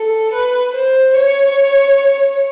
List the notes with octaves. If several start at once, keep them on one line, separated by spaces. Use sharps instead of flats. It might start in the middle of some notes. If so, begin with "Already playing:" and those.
Already playing: A4
B4
C5
C#5